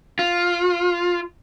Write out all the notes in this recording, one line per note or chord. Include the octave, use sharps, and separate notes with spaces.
F4